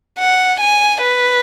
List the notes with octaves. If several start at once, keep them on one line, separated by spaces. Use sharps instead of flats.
F#5
G#5
B4